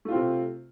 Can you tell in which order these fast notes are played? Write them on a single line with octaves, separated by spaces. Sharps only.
A3 F4 C4 C3